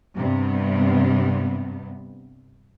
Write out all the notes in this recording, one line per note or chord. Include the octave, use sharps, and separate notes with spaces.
G2 C3 B3